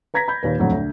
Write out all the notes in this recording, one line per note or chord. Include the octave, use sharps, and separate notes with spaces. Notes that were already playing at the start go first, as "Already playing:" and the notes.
B4 A#5 G#6 A#6 B6
B5 G6
D#2 A#2 B4
F2 A2 D3 F#3
D2